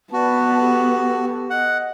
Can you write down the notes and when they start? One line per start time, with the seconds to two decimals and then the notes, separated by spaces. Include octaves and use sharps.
0.13 B3 F#4 B4 D5 A5
0.60 G4 A4
1.50 D#5 F#5